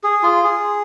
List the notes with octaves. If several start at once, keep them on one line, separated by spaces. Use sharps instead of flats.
G#4
F4
G#4